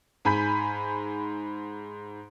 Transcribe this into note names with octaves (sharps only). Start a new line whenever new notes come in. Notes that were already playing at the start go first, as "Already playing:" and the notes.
G#2 G#5 B5 G6 B6